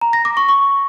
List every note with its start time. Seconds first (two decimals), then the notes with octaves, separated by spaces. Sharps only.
0.01 A#5
0.13 A#6
0.25 D6
0.37 C#6
0.49 C#6